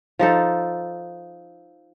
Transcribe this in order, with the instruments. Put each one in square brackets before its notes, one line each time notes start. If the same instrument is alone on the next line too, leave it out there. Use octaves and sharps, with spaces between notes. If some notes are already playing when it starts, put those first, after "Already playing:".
[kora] F3 D#4 A4